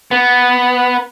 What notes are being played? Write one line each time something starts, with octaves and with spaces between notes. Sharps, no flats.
B3